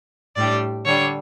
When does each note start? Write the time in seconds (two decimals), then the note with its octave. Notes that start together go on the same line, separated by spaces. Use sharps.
0.35 A2 G3 D4 G4 D5
0.85 D3 G3 D4 C#5